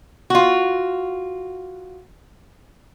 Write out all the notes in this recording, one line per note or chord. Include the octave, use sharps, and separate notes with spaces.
F4 F#4